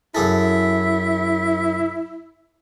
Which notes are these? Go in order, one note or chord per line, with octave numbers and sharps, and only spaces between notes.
F#2 E4 G#4 A4